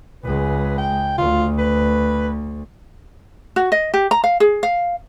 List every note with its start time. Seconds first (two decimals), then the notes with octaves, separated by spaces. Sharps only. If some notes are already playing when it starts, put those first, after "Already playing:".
0.24 C#2 G#3 B4
0.78 G5
1.18 D2 F4
1.58 B4
3.56 F#4
3.72 D#5
3.94 G4
4.11 A#5
4.24 F5
4.40 G#4
4.63 F5